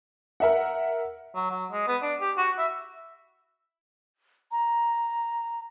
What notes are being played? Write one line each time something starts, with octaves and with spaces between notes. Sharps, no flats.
A#4 E5 F#5
F#3
F#3
G#3
B3
D4
G4
F#4
E5
A#5